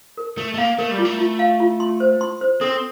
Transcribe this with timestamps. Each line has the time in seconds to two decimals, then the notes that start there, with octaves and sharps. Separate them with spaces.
0.18 A#4
0.37 A3 A#4
0.54 A3
0.58 A#3 F5
0.78 A3 A#4
0.91 G3
0.99 F4
1.05 A3
1.19 F4
1.39 F5
1.60 F4
1.80 C6
2.00 C5
2.21 C6
2.41 C5
2.61 C4 A4